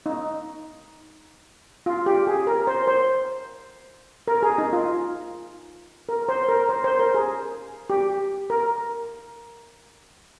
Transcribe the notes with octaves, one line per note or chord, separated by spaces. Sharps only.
D#4
F4
G4
G#4
A#4
C5
C5
A#4
G#4
D#4
F4
A#4
C5
A#4
C5
C5
A#4
G#4
G4
A#4